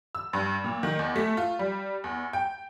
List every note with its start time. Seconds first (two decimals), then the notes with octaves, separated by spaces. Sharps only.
0.15 E6
0.33 G2
0.64 A#2
0.83 D#3
0.99 E2
1.16 A3
1.37 F4
1.59 G3
2.04 E2
2.33 G5